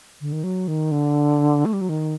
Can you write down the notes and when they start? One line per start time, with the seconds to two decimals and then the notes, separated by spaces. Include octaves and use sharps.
0.21 D3
0.32 D#3
0.44 F#3
0.68 D#3
0.92 D3
1.65 A3
1.73 G3
1.81 F#3
1.89 D#3